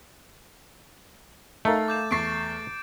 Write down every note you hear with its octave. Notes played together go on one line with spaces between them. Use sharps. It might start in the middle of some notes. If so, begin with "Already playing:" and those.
A3 D#4 A#4 F5 A6
D6 G6 E7
E2 C#6 A6 C7 D7